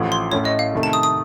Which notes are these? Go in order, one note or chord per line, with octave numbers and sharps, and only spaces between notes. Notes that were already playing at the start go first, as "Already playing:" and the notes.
Already playing: A1 A2 F3 A3
C6
A2 A3 C#4 C#5
D#5
F5
C3 D#3 A3
A5
D#6
D#6